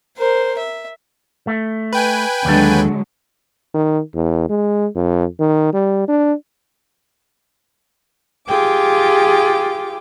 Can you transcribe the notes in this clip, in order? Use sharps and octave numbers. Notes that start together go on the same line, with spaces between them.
A#4 C5
E5
A3
B4 G5 G#5
D#2 D3 F#3 G#3 A4
D#3
E2
G#3
F2
D#3
G3
D4
F4 G4 G#4 G5 D6